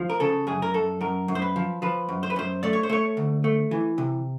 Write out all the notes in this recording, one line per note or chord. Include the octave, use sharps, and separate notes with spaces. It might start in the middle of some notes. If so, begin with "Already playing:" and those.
Already playing: F3
A#4
C#3 A4
F#2 G#4
A#4
F#2 A4
F#2 A#4
F#2
C5
B4
F3
F3 B4
F#2
C5
B4
F#2 C5
A3 D5
C#5
C5
A3 C#5
D2
A3
E3
C3